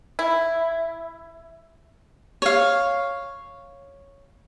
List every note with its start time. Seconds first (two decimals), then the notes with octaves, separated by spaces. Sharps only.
0.19 E4
2.42 C#5 F5